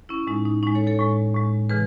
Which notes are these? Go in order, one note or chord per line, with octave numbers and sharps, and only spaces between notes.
C#4 E4
A2 G#3 D#4
D#4
A2 G#3 D#4
A4 C#5
A4 C#5
A2 G#3
A2 G#3
C#3 E3 G#3 G#4 B4